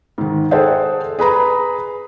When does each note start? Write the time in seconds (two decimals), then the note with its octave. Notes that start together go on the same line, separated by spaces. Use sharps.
0.18 G#2 D#3
0.51 G#4 A4 C5 E5 F#5 G5
1.19 G#4 B4 A#5 B5